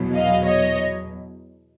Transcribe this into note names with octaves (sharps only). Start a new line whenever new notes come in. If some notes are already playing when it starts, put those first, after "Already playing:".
Already playing: E2 B2 F#3
D#5 F5
C#5 D#5